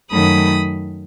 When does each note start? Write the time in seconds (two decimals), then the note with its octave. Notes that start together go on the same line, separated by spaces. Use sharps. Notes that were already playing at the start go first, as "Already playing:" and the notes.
0.12 F#2 D#3 F#3 A3 B5 D#6